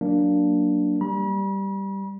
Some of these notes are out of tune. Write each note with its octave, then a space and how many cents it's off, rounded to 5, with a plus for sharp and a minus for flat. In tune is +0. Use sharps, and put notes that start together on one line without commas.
F#3 +0 A#3 +0 D4 +0
G3 +0 B5 -45